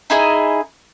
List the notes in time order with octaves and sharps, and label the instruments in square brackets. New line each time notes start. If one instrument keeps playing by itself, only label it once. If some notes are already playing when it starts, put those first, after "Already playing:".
[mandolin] D#4 E4 G#4 D#5